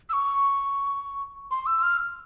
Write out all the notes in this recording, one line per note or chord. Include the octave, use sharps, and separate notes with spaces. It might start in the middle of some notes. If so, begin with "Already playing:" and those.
E6
C#6
C6
E6
F6